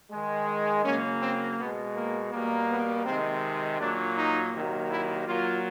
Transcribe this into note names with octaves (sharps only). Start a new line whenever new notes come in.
D#3 G#3
C#3 F#3 A#3 C#4
C4
B2 G#3 B3
A#3
B2 G3 A#3
B3
C3 D#3 G#3 C4
A#2 F#3 A#3 D4
D#4
C3 D#3 F#3 A#3
E4
A#2 F#3 A#3 F4